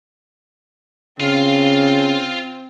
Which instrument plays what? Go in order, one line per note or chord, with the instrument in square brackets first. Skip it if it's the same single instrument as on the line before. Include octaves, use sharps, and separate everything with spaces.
[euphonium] C#3 [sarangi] C4 [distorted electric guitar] F4 F5